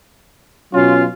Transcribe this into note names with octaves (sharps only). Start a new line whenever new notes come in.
B2 F#3 C#4 F4